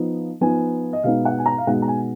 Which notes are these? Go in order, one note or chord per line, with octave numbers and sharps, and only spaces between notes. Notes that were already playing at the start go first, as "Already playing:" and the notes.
Already playing: F3 B3 D#4
F3 B3 D#4 G#5
D#5
B2 G#3 B3 D#4 F5
F#5
G#5
A#5
F5
B2 G#3 B3 D#4 F#5
A#5
G#5